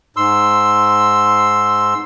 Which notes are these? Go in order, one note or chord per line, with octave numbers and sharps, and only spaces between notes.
G#2 C6 E6